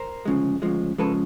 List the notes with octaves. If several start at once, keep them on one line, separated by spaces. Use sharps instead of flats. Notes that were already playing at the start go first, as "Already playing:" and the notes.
Already playing: A#4 C5
D2 C#3 F3 G#3
D2 C#3 F3 G#3
C#3 F3 G#3 A4 B4